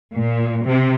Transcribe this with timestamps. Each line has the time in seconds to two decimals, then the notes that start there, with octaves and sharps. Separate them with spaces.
0.15 A#2
0.65 C3